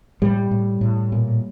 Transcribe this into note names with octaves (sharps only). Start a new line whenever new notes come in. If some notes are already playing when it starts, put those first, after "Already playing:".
A2 G3
A2
A2
A#2